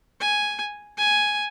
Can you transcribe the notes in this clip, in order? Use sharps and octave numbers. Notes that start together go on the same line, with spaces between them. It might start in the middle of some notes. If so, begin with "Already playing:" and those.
G#5
G#5